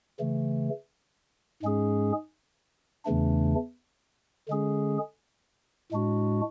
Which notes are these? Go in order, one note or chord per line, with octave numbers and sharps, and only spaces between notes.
C#3 E3 A3
G#2 G#3 C#4 G#4
E2 C#3 E3 A3 D4
D3 G#3 C#4 G#4
A2 G#3 D4 F#4